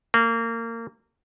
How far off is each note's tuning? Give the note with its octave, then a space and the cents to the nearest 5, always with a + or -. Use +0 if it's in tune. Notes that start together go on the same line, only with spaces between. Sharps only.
A#3 -25